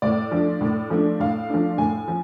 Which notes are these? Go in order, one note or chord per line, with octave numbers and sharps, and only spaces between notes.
A2 D5
F3 A3 D4
A2
F3 A3 D4
A2 F5
F3 A3 D4
A2 G#5
F3